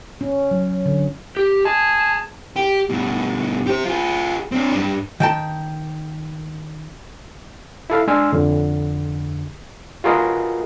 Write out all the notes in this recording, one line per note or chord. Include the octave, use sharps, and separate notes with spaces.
C#4
F#3
D3
G4
G#4 A5
G4
G2 B2
G4 C5
F4 G#4
C4 D4
G2 D4
D#3 G5 A5
E4 A4 F5
G#3 D4 G#5 C6 E6 F6
F2 D3
F4 F#4 G#4 A#4 B4 D#5